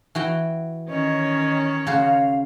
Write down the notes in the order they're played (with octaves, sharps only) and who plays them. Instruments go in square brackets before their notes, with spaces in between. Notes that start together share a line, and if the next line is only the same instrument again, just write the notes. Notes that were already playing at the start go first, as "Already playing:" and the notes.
[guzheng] E3 F#4 G5
[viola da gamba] D#3 C#4 C#5 [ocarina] D#5
[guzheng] C#3 F#4 C5 [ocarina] F5